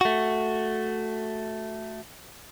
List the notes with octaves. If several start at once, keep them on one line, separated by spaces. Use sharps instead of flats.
A3 F#4